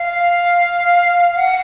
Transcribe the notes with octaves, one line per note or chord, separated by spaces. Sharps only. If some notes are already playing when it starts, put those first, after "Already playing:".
Already playing: F5
F#5